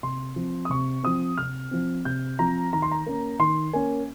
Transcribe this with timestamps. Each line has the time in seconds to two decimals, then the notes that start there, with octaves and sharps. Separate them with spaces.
0.03 C3 C6
0.36 F3 C4
0.65 D#6
0.70 C3 C#6
1.03 F3 C4 D#6
1.38 C3 F6
1.71 F3 C4
2.05 C3 G6
2.39 F3 C4 A#5
2.73 D#3 A#5
2.82 C6
2.91 A#5
3.06 A#3 C#4
3.39 D#3 C6
3.73 A#3 C#4 G#5